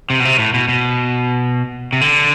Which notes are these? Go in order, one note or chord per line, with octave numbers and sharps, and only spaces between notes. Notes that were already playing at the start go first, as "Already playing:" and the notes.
C3
B2
C3
A2
B2
B2
C3
D3